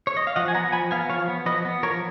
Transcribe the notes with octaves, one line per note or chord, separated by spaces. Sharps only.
C#5
D#5
F5
F3 D#5 F#5
G#5
B3 F#5 A#5
F3 G#5 B5
B3 F5 G#5
F3 C#5 F5
B3
F3 B4 D#5
B3
F3 A#4 C#5